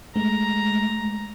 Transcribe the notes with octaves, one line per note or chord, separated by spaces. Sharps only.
G#3 A3 A#5